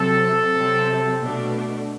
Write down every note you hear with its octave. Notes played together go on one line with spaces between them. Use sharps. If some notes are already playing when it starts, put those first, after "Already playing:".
Already playing: C3 F#3 C4 A4
C3 F#3 C4
B2 A3 D4